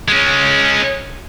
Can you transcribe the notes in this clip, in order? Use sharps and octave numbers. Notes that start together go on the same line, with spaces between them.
G#3 C#4